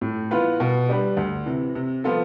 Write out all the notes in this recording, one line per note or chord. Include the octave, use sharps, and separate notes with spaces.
A2
E3 B3 F4 B4
B2
G3 D4 G4 B4
D2
C3 E3
C3
F3 B3 F4 A4